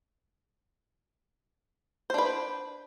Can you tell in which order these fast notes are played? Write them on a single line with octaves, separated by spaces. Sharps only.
C5 D4 B4